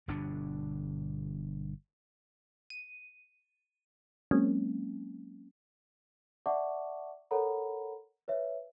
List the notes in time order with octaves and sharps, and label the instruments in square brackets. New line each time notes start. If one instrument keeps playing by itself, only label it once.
[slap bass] G1 G2 B2 D4
[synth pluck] D#7
F#3 G#3 A#3 C4 C#4
[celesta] D5 E5 F#5 A5 C#6 D6
A4 A#4 C#5 F#5 A#5 B5
B4 C#5 E5